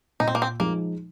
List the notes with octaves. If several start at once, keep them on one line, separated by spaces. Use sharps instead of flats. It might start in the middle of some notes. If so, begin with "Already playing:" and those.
A#2 D#4
C4
A#3
C4
F3 G#3 A#3 D#4